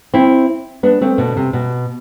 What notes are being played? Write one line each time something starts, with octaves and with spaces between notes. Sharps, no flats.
C4 E4
B3 D4
A3 C4
B2 D3
C3
B2